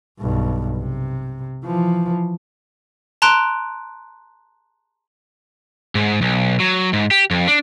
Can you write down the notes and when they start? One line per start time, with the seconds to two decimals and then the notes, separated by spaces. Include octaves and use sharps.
0.19 B1 G2
0.78 C3
1.64 E3 F3
3.22 A5 A#5 C6 F#6 D7
5.95 G#2
6.21 B1
6.60 F#3
6.93 G#2
7.11 G4
7.31 F2
7.48 D4